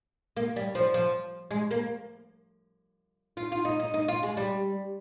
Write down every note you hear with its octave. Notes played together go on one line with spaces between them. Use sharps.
A#3
G3
F3
F3
G#3
A#3
F4
F4
D#4
D#4
D#4
F4
G#3
G3